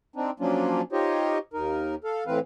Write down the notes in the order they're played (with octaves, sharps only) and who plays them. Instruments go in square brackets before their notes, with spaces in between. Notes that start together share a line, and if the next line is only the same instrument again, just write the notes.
[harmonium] C4 D4 D#4
F3 F#3 A#3 C#4 D4 F4
D#4 F4 G4 C5 C#5 D#5
D#2 D#4 A#4
A4 F5
A2 E3 C4 B4 F5